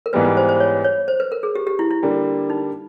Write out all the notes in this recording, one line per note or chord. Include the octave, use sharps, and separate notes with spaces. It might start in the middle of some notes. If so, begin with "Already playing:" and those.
A#4
G#2 E3 G3 B3 B4
B4
C5
C5
C#5
C#5
C5
B4
A#4
G#4
G4
G4
E4
E4
D3 G3 A#3
D#4